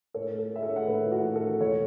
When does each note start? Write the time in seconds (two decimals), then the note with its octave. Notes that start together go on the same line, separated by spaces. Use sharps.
0.14 A2 A4 C#5
0.33 A3
0.39 A4
0.51 A3 E5
0.63 A4 C#5
0.69 A2
0.76 F#5
0.87 A2 B4 E5
1.06 E4
1.12 F#4
1.23 A1
1.36 A4
1.41 A3
1.60 E1 A4 C#5